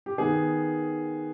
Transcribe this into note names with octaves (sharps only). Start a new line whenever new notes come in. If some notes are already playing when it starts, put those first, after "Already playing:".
G4
D#3 B3 G#4